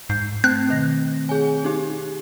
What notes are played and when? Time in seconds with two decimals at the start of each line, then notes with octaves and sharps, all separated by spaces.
0.10 G#2 G6 C7
0.44 A3 C4 F#6
0.69 B2 D#3 A#6
1.29 G#4 C#5 G#5
1.65 D#4 G4